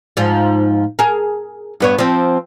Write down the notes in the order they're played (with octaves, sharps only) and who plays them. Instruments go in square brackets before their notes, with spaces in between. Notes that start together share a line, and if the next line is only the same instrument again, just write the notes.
[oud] G#2 F3
G#4 A#4
G2 B3 C#5
F3 C4